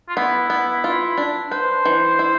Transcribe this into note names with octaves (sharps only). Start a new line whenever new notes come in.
F4
B3 E4
B3
F4
D4
B4 C5
E3
E4